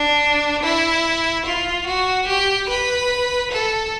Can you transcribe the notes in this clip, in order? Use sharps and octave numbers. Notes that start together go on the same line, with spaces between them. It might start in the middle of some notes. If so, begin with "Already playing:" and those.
Already playing: D4
E4
F4
F#4
G4
B4
A4